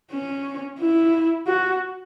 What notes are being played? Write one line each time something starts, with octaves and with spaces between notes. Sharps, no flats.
C#4
E4
F#4